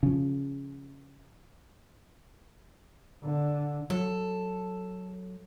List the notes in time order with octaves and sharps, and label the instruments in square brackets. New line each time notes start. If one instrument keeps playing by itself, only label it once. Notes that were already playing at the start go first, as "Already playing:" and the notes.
[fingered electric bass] C#3 F3
[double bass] D3
[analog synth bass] F#3 [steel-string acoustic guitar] A4